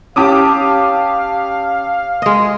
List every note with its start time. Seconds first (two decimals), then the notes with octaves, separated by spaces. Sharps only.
0.16 C#4 G4 F5 A5 D6 D#6
2.22 G#3 D#5